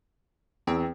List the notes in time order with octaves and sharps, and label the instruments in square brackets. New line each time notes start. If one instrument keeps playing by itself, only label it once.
[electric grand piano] E2 [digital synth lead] C4